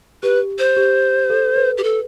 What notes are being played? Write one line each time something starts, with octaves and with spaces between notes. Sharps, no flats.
G4 B4
C5
G4
A4
B4
G4
A4